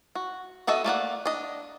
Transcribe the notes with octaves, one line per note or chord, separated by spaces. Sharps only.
F#4
B3 F#4 A4 D#5 E5
A3 A#3 D5 F#5
D4 D#5